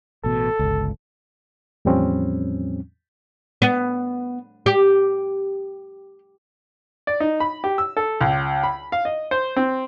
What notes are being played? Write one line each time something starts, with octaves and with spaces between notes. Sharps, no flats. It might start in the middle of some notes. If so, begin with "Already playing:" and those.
A1 B2 A4
G1 C#2
E2 A2 F3 G3 C4 C#4
B3
G4
D5
D#4
B5
G4
E6
A4
C#2
B5
F5
D#5
C5
C4